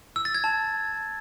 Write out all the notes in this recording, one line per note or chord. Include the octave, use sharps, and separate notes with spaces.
E6
A6
G#6
A5